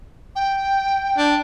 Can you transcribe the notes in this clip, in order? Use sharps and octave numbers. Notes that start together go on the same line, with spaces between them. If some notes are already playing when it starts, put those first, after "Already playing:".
G5
D4